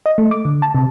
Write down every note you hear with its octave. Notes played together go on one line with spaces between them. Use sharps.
D#5
A3
D6
D3
A5
C3